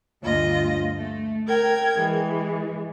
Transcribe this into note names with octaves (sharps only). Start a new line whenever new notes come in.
D2 G2 F4 D#5
A3
A#4 G5 G#6
E3 G#3